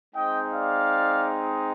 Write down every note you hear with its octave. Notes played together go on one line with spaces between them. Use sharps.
G#3 C4 D#4 D#5 G5
D5 F5